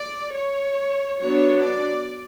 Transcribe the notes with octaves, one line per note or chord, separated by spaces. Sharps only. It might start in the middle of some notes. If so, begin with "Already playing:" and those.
Already playing: D5
C#5
F#3 B3 D4 C#5
D5